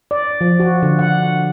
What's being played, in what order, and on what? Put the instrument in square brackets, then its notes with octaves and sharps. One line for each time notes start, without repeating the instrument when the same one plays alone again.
[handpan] D5
F3
F#4
D3
F#5